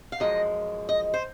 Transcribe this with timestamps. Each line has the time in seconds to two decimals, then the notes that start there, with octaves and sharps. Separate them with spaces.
0.12 F5
0.20 F#2 F3 G#3 D#5
0.89 D#5
1.14 C5